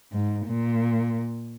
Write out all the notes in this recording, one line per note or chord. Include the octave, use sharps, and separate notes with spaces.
G#2
A#2